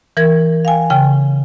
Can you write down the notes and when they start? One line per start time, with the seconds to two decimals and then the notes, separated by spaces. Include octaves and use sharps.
0.17 E3 A#4 G#6
0.65 F5 G5 G#5
0.90 C#3 G5